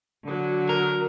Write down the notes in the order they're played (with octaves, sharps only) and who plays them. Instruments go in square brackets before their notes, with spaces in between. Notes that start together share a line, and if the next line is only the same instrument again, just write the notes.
[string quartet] D3 F#3
[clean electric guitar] A#4